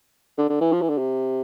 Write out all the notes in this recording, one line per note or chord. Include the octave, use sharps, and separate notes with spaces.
D3
D3
E3
F3
E3
D3
C3